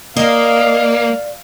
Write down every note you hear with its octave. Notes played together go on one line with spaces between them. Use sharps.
A#3 D5 D#5 F5